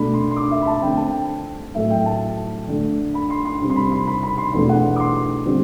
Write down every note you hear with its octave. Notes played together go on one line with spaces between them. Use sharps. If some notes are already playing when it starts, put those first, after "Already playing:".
Already playing: B2 A3 D4 B5
C6
C6
D6
E5
B5
A5
D3 A3 C4 G5
A5
G5
A2 F#3 A3 E5
G5
A5
D3 A3 D4
B5
C6
C6
C3 G3 C4
C6
B5
C6
B5
B5
C6
E2 B2 A3 D4 C6
F#5
D6
C6
D3 G3 C4